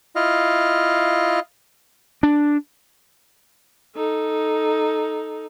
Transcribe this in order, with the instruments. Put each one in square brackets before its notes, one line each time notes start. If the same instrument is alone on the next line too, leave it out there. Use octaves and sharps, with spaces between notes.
[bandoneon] E4 F4 D#5 F5
[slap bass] D4
[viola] D#4 A4